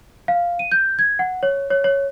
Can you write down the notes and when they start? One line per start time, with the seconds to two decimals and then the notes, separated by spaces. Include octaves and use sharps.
0.28 F5
0.59 D#7
0.72 G6
0.99 G#6
1.19 F#5
1.43 C#5
1.70 C#5
1.84 C#5